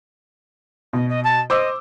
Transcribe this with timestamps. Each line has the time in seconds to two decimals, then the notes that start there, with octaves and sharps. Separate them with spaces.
0.93 B2 D#5
1.09 D#5
1.23 A5
1.50 C5 D#5 D6 E6